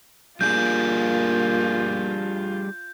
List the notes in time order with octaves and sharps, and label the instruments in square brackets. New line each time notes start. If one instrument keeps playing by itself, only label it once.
[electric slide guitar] G3 D4 G#4 [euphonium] A#3 [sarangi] F4 [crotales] G6